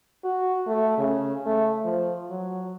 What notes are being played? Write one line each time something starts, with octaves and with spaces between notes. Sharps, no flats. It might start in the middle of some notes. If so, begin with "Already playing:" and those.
F#4
A3
C#3
A3
F3
F#3